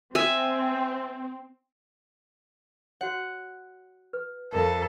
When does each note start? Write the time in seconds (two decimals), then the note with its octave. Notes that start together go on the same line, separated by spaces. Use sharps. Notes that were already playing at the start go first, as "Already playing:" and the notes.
0.15 C4 E5 G#5
3.01 F#4 C#5 F#5
4.13 B4
4.53 F2 A4 A#4 E5